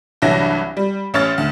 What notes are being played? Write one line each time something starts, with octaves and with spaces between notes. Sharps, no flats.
C2 G2 E3 F#3 A#6
G3
A1 C#4 C#5 F6 A6
D2